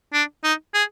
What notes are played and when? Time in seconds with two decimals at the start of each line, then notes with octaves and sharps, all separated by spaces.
0.13 D4
0.44 D#4
0.74 G#4